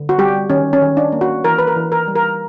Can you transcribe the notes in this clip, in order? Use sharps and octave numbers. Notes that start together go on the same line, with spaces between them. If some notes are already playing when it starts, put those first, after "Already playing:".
Already playing: D3
F#4
G3 G4
D#3 C#4
C#4
D#3
D4
A#3
F#4
E3 A#4
B4
A#4
E3
A#4
G3
A#4